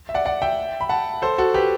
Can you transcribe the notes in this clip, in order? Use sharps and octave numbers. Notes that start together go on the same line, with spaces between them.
E5
D5 F#5
D5 F#5
E5 G5
B5
F#5 A5
A4 C5
F#4 A4
G4 B4